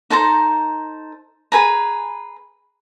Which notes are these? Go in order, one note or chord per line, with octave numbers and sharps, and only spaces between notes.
D#4 A4 C5 A#5
G#4 B4 G#5 A#5